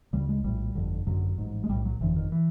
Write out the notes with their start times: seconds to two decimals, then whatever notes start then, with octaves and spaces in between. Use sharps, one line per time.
0.13 D2 C#3 G3
0.29 G#3
0.44 A#1 A2 G3
0.75 G1 F2 D3
1.06 G#1 F#2 D3 F#3
1.38 A1 G#2
1.64 G#3
1.69 B1 A2 G3
1.85 F#3
2.01 G1 F2 D3 E3
2.16 D#3
2.32 E3